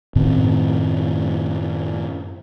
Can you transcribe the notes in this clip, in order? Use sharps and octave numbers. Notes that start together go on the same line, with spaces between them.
F#2 A2 D#3 C4